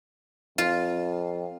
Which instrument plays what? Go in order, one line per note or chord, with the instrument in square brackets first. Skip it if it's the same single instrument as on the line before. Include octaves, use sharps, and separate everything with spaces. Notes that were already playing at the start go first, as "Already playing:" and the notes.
[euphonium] F2 [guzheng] F4